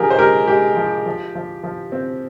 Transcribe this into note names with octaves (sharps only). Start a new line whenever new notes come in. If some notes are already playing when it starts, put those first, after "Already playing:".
Already playing: F3 D4 G4 G#4 A#4
C5
G#3 G4 A#4
G#3 G4
F3
F3
F3
F3
C4